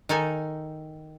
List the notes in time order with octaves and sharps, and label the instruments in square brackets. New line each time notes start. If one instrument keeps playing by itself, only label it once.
[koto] D#3 D#4 A4 G#5